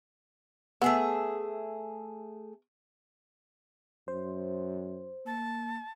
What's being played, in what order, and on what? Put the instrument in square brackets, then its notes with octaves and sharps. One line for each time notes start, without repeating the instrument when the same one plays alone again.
[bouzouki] A3 G#4 E5 [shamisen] B3
[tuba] F#2 [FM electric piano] C5
[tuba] A#3 [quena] A5